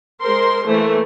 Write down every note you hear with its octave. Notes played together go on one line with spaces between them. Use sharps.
G#3 A#4 C5 C6
E3 A3 A#3 C5